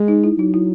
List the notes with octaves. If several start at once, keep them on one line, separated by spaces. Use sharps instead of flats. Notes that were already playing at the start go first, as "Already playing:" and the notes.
Already playing: G#3
D#4
E4
F#3 D#4
E4